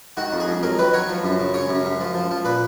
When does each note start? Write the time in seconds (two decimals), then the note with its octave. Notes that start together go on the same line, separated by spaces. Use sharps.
0.17 D#3 F#4
0.33 F2
0.40 G#4
0.48 F2
0.63 F#3 A#4
0.79 D#3 B4
0.93 F#3 C#5
1.09 F3
1.24 F#2
1.39 C#3
1.54 C#3 C#5
1.69 F#2
1.85 F#2
2.00 F3
2.14 F3
2.31 F3
2.45 A#2 B4